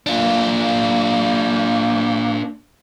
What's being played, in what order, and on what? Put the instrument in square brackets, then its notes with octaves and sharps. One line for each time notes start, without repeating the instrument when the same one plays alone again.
[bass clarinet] A#3 [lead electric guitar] D4 F4